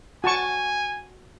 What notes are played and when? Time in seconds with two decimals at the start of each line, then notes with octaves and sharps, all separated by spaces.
0.24 F#4 G#5 A5 C#6